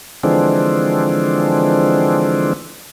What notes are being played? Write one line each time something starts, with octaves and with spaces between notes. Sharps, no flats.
D3 E3 F3 G#3 C4 D4